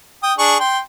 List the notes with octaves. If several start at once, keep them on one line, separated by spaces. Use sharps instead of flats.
G5 D#6
D4 G#4 C#6
G5 C6